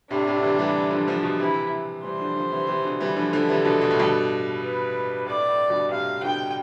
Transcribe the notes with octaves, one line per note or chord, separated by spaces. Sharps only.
A2 C3 D4
A2 C3
D3
C3 E3
E3 G3
D3 F3
D3 F3
B2 D3
C3 E3 E4
E3 G3 C5
D3 F3
D3 F3
C3 E3
C3 E3
B2 D3
E3 G3
D3 F3
D3 F3 A4
C3 E3
B2 D3
B2
A2
G2 B2
B4
A2 D5
A2
G2 B2
A2 C3 F5
B2 D3 G5